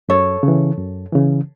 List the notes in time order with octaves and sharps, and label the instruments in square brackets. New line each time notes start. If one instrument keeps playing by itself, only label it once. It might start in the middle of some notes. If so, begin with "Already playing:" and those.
[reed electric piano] F#2 [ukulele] A4 C#5
[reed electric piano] C#3
E3
F#2
C#3 E3